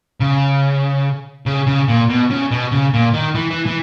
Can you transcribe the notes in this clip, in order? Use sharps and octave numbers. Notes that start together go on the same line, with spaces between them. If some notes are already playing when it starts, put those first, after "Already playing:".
C#3
C#3
C#3
A#2
B2
C#3
B2
C#3
A#2
D#3
E3
E3
E3